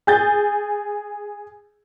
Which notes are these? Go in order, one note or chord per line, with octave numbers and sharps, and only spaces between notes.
G#4 G6 A6